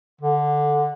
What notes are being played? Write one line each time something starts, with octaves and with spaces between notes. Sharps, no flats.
D3